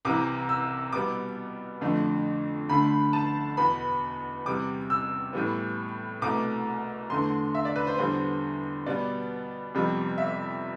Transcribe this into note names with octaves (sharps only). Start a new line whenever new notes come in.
C2 C3 E3 D6
E6
B2 G3 B3 D6
F2 D3 A3
D2 D3 A3 B5
A5
E2 B2 B3 B5
E2 C3 G3 D6
E6
A2 E3 G3 B3
C2 B2 A3 D6
E2 D3 A3 C6
E5
D5
B4
C5
E2 D3 G3 B3 C5
B2 G3 B3 D5
F2 C3 G3 B3
E5